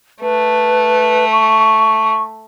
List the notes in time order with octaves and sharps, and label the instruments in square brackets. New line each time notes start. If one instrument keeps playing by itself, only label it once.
[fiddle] A3 [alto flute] B4
[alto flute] C#6